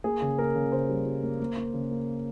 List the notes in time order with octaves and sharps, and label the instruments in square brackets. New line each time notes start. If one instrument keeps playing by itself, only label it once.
[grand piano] A#3 G#4
C#3
A#3 A#4
C#3
C#3 C5
G3
G3
A#3
A#3
A#3
C#3
A#3